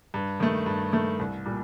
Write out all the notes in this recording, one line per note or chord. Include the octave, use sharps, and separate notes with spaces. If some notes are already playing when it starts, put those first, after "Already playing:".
G2
D#3 A3
G2
D#3 A3
C2
A#2 G3